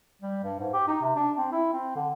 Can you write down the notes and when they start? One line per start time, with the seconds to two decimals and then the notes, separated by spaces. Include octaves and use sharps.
0.22 G3
0.43 G2
0.59 G#2
0.73 G4
0.88 D#4
1.01 C3
1.16 D4
1.38 C4
1.52 E4
1.73 C4
1.96 D3